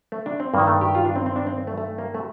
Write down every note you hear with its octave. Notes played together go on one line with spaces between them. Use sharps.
A3
D4
C4
G2 D#3 A#3
A3
G4
F4
D4
C4
C4
D4
C4
A3
A3
A#3
A3